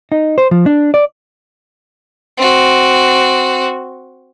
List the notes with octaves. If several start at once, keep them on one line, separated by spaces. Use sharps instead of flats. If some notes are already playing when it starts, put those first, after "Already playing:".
D#4
C5
F3
D4
D5
C4 F#4